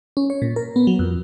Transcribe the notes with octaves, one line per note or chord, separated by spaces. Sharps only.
C#4
C#5
A#2
A#4
B3
F#3
F2